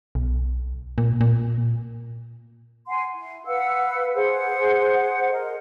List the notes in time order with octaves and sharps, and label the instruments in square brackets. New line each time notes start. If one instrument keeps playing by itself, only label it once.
[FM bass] B1
A#2
A#2
[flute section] F#5 G#5 C6
E4
B4 F5 F#5 E6
G#4 C5 F#5
A#4 D#5